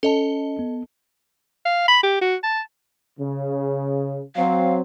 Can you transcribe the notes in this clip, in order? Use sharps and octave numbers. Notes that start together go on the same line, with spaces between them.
C#4 A4 D#5 A5
B3
F5
B5
G4
F#4
A5
C#3
F#3 C4 F5